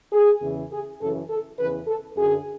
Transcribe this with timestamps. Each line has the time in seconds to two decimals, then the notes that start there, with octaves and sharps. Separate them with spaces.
0.12 G#4
0.41 E2 C#3 E3
0.72 G#4
1.01 F#2 C#3 E3 A4
1.30 A4
1.58 E2 C#3 E3 B4
1.87 A4
2.16 F#2 D3 G#4